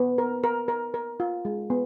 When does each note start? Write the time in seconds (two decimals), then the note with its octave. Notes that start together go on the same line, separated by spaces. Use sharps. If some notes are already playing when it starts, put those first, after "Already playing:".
Already playing: B3
0.18 A#4
0.44 A#4
0.68 A#4
0.94 A#4
1.20 F4
1.45 G#3
1.70 B3